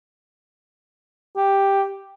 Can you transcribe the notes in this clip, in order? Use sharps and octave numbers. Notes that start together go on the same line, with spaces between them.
G4